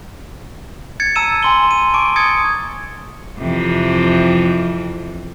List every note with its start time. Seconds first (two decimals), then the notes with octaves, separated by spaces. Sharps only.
1.00 G#6 A6 C#7
1.15 A5 A#5 E6 D#7 E7
1.43 G#5 C6 G7
1.71 D#7
1.94 A5 C#6 D6 D7
2.16 C#6 D#6 G#6 A6 C#7
3.38 F2 C3 E3